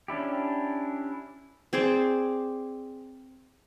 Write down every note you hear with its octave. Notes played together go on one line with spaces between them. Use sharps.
C#4 D4 E4 G4
C4 G#4 C5 D5